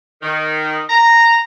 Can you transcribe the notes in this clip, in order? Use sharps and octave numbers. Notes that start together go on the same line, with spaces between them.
D#3
A#5